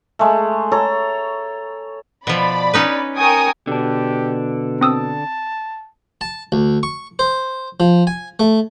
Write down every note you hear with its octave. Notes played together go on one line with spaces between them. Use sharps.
G#3 A3
A4 C#5 A#5
B2 F3 D5 B5
C#4 D#4 B4
A#4 G5 G#5 C#6 D#6
B2 D3 D4 G4
C4 A5 D#6 E6
A5
D2
C#6
C5
F3
G#5
A3